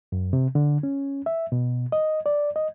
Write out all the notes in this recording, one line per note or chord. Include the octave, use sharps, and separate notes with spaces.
F#2
C3
D3
C#4
E5
B2
D#5
D5
D#5